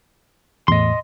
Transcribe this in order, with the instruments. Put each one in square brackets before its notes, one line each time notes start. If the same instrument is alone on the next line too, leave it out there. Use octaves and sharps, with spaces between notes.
[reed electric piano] E2 A2 [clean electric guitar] D#5 C6